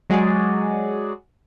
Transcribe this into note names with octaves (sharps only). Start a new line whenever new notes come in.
F#3 G#3 F#4 G#4 D5